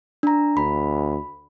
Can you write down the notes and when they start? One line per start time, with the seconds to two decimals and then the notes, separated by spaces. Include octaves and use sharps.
0.23 D4 A#5
0.57 D2 B5